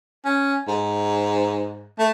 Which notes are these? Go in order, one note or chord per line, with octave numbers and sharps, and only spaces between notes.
C#4
G#2
A3